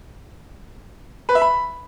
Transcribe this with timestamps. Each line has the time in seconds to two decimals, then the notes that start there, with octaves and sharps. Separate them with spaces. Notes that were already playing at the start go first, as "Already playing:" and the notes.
1.29 B4
1.35 E5
1.42 B5